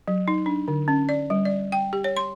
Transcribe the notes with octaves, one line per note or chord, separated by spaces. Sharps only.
F#3
D#4
D4
D3
C#4
D5
G3
D5
G5
G4
C#5
C6